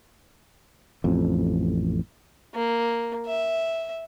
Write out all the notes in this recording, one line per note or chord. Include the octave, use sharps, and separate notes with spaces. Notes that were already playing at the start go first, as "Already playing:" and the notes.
A1 F2
A#3
E5